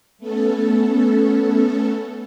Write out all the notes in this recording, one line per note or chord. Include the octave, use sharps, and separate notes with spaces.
A3 B3 C#4 A4